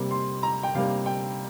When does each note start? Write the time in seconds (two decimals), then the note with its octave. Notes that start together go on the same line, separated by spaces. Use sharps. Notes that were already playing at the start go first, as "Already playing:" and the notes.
Already playing: C3 G3 A#3
0.11 C6
0.43 A#5
0.63 G5
0.75 C3 G3 A#3 F5
1.06 G5